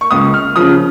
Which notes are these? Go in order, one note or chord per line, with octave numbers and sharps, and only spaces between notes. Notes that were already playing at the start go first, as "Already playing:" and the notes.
C#6
C#2 D#6
F6
C#3 F3 D#6